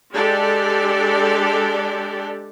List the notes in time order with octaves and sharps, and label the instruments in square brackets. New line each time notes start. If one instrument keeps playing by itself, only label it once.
[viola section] G#3 D4 G4 A4 D5